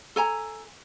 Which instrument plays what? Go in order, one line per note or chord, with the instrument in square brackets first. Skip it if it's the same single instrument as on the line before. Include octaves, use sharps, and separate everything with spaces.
[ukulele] A4 G#5 A#5